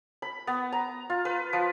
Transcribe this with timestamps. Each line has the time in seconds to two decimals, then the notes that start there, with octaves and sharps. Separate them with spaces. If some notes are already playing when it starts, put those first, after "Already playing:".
0.22 B5
0.47 B3
0.72 A#5
1.10 F4
1.25 B4
1.53 F3